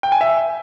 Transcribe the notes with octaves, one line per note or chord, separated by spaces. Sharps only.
G5
G#5
E5